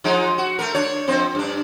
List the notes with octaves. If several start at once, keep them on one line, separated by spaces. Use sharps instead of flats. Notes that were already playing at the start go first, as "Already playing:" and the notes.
F3 G#3 D#4
F#4
A3 A#4
D4 C#5
F2 C4 C5
G2 D4